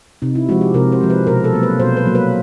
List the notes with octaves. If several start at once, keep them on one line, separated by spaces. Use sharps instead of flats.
C3 D#4
E4
F3 G#3 F#4
G4
C3 A#4
C5
F3 G#3
B4
B2 A#4
A4
F#3 A#3
B4
B2 C5
B4
F#3 A#3
B4